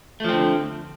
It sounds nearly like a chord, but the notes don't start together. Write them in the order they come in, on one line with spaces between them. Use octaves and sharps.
A3 F3 C4 D3